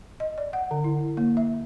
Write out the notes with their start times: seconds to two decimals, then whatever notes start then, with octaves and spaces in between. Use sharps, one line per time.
0.20 D#5
0.38 D5
0.53 F#5
0.71 D3
0.84 E4
1.17 A#3
1.37 E5